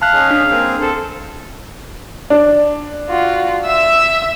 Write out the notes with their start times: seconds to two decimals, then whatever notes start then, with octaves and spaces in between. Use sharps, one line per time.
0.02 E5 F5 A5 E6 F#6
0.13 C#4 D#4 G#4
0.31 D4
0.51 A#3 C4 G#4
0.81 C4 A4 C5
2.30 D4
3.10 F4 F#4
3.66 E5 E6